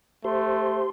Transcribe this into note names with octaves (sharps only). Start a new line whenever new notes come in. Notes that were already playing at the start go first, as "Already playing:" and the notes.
A3 G4 C5 C6